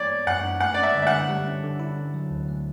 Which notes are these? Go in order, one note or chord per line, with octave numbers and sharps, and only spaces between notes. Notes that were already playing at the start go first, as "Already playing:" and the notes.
Already playing: E3 E4 C#5 D5
B3
F#2 F#5
D4
A3 F#5
C#4 D5
E5
D3
E5
D3 F#5
G3
C#4
D3
E4
D3
F#3
D2
A3